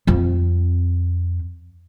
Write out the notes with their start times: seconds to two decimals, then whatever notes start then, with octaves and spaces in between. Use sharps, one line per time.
0.07 F2 C4